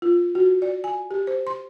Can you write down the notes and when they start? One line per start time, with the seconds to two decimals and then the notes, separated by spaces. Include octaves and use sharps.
0.02 F4
0.35 F#4
0.62 D5
0.84 G#5
1.11 G4
1.27 C5
1.47 C6